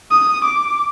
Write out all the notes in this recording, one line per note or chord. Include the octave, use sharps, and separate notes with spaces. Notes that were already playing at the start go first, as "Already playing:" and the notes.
D#6
D6